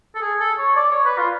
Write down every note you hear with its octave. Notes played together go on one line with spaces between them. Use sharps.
A4
G#4
A4
C#5
D5
C#5
B4
F4